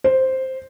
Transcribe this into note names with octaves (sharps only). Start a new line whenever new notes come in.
C5